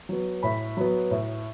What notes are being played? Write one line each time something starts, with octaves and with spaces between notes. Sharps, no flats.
F#3 B3
A2 B5
F#3 B3
A2